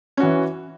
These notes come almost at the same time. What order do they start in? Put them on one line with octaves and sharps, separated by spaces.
C#4 F#4 E3